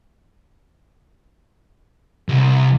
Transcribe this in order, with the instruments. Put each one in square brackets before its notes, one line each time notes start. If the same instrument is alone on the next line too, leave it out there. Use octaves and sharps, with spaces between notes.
[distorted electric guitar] C2